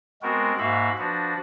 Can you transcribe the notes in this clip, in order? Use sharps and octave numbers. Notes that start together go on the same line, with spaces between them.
G#3 B3 C4 F#4 A#4
G#2 A#3 F#4 E5 F5 B5
F3 D4 F#4 B4